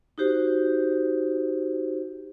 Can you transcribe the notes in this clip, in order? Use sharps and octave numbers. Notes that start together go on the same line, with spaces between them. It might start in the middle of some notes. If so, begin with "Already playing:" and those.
D#4 F#4 G4 C5